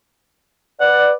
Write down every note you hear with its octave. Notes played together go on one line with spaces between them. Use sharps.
B4 D5 F#5